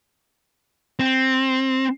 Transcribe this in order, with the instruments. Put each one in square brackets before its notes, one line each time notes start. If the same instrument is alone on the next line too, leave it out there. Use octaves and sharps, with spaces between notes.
[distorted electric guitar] C4